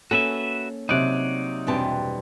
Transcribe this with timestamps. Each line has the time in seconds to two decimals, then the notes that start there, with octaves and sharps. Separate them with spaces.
0.11 A#3 C#4 F#4 A4 B4 E5
0.89 C3 F#3 D#4 D5 F#6
1.67 E2 G2 B2 C4 D4 A5